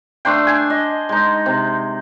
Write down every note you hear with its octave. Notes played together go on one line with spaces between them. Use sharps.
A3 D4 C5 G5
G#5
D#5
G#3 D#4
C3